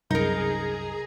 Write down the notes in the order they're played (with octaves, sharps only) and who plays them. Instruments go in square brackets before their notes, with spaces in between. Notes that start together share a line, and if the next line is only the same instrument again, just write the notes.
[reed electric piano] C2 F#2 G6 [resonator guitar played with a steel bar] D#4 A#4 [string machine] G#4 [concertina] A#5